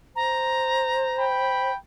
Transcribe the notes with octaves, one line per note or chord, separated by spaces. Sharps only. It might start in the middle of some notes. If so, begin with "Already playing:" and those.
C5 A#5
G5 B5